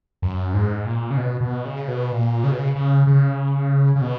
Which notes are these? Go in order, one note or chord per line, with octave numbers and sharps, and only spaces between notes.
F#2
G#2
A#2
C#3
B2
B2
C#3
B2
A#2
C#3
B2
C#3
C#3
C#3
C#3
B2